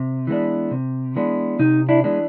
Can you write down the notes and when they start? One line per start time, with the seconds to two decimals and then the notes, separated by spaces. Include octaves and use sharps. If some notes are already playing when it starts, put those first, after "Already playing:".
Already playing: C3
0.27 E3 G#3 B3 D4
0.71 C3
1.16 E3 G#3 B3 D4
1.59 C3 D#4
1.89 D4 E4
2.04 E3 G#3 B3 D4